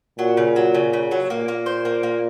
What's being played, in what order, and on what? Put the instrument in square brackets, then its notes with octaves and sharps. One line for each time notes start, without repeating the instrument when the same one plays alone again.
[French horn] A#2 [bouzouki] F#3
[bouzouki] C#3
F#3
C#3
C#3
F#3
[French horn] A#2 [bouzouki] A#3
[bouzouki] A#3
C5
A#3
A#3